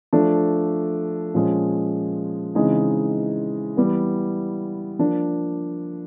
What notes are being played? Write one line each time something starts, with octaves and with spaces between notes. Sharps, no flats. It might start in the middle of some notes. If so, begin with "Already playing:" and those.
F3 A3 D4
A#2 F3 G#3 C#4
C#3 E3 G#3 C4 D#4
E3 G3 B3
F3 A#3 D4